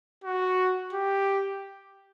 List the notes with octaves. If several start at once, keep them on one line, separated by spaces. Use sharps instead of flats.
F#4
G4